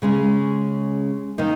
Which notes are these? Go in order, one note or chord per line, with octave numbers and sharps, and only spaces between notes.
C#3 G#3 C#4
D#3 A#3 D#4